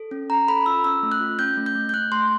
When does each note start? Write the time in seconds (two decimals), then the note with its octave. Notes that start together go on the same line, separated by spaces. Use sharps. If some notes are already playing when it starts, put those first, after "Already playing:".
Already playing: A4
0.11 C#4
0.30 C#4 A#5
0.48 A4 B5
0.66 F4 E6
0.84 C#4 E6
1.03 A3
1.12 F#6
1.21 F4
1.39 C#4 G6
1.57 A3
1.66 G6
1.75 A3
1.89 G6
1.93 A3 F#6
2.12 A3 C6